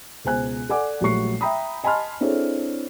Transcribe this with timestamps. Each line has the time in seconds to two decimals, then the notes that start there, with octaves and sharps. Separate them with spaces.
0.25 C#2 B2 C5 G#5 F#6
0.69 A4 D5 F#5 G#5 D6
1.01 A#1 F#3 G3 A3 C#6 C7
1.41 E5 G5 A#5 B5 D#6
1.84 D#5 G#5 A5 B5 C6 F6
2.21 C4 D4 E4 G#4 A4 C#5